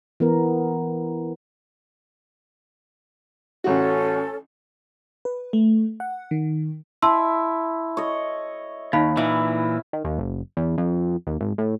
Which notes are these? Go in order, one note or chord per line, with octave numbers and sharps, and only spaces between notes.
E3 B3 A#4
A1 C#4 F#4 A4
B4
A3
F#5
D#3
E4 A5 C6 E6
C#5 D#5
D#2 D#4 F5 B5
A#2 E3 E4
D#3
D#2
F#1
E2
F2
D#2
G#1
A2